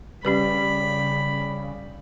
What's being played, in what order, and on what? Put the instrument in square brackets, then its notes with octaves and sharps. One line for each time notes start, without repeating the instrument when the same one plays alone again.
[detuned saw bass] C#3 [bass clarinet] G3 [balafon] C#4 G4 B4 [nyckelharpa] B5